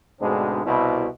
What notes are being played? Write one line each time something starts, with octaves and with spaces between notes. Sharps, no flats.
D2 G#2 B2 G#3 C4 D4
C2 B2 E4